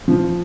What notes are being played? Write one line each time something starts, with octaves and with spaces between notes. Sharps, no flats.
F3